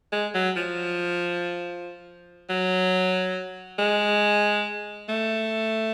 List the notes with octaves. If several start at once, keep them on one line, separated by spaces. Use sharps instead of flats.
G#3
F#3
F3
F#3
G#3
A3